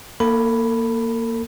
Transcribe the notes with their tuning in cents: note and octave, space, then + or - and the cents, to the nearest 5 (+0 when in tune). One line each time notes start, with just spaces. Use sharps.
A#3 +0 A4 +40 B5 +0